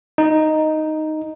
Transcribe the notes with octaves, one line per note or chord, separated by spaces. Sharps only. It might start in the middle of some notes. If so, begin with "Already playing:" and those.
D#4